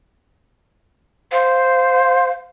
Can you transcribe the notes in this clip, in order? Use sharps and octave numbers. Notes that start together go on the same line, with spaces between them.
C5 F5